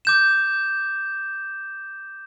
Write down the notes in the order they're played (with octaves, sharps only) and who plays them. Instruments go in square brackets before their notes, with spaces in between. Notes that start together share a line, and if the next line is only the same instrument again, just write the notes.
[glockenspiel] D6 G6 E7